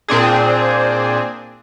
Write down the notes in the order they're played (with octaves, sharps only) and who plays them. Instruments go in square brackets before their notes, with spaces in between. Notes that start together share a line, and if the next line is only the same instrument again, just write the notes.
[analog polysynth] A#2 C4 D4 G#4